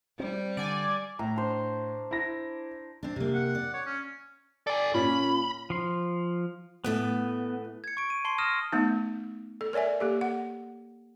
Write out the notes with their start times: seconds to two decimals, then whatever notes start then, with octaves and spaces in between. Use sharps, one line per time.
0.20 G3 C4
0.57 D3 D5 G#5
1.19 A2 A#5
1.36 D4 C5
2.11 E4 A#6
3.03 C4 D4
3.16 C3 A#3
3.34 F#5
3.55 D5
3.74 C#5
3.86 C#4
4.67 A4 D5 G#5
4.94 A#2 C#4 B5 B6
5.70 F3 C6
6.84 A2 E3 A3 B3
7.84 G#6 C#7
7.97 C#6 D7
8.10 D#7
8.25 A5 C6 C7 G7
8.38 D#6 F6 A#6 D#7 E7
8.72 A3 B3 D#4
9.61 A4
9.73 A#4 C#5 D5 E5 G#5
10.00 A#3 G4 A4
10.21 F#5